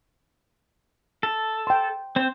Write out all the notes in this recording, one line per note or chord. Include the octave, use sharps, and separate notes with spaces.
A4
G5 C6
C4 C5